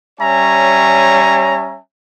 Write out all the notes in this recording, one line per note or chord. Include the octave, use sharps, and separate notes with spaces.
G3 C#4 C#5 E5 G#5 A#5